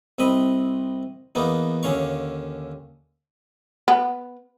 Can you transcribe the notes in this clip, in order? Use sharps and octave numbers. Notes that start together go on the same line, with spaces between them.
C2 C4 D#5 B5 D#6
E2 A#3 B3 D#4
D#2 D3 C#4 F5 C#6
B3